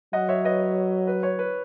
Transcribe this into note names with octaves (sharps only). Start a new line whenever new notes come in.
F#3 D#5 F#5
C#5 E5
B4 D#5
B4
C#5
B4